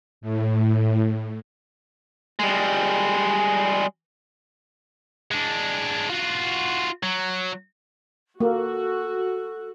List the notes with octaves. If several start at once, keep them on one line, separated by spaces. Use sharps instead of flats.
A2
G3 G#3
G#3 D4
F4 F#4
F#3
A#3 F#4 A4